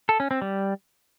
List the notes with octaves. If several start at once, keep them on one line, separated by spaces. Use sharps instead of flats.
A4
C#4
C4
G3